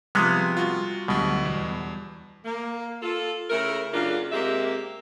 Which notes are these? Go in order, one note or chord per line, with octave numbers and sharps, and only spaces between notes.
C3 F3 G3 G#3 B3 D#6 F6
F4 F#4
D2 B2 F#3 G3
E2
A#3
F4 A4
C#3 A3 E4 A#4
F#2 C#3 A#3 D4 F4
C3 G#3 A#3 G4 E5